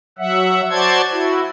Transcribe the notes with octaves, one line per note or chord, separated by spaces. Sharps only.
F#3 E5 F#5
F#4 C5 D5 A5 C6 G#6
E4 F#4